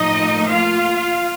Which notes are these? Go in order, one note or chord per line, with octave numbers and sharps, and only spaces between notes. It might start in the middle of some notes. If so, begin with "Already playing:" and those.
Already playing: A2 F3 A#3 D#4 D#5
F4 F5